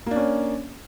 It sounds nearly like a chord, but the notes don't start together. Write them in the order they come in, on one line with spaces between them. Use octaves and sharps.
A#3 D4 C#4